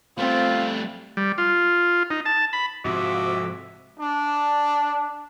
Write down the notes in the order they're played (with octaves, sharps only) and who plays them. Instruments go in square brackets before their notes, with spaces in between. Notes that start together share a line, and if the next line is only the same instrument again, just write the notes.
[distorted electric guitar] G3 A3 [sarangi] C4 [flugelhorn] F4
[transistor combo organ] G3
F4
D#4
A5
B5
[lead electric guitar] F2 [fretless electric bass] G#2 C3 F3 [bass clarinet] F#4 [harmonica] E5 D6
[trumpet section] D4